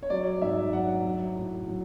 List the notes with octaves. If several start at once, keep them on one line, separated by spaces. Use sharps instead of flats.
C#5
F#3 D5
G#2 E5
F#3 F#5
F#3
A2
F#3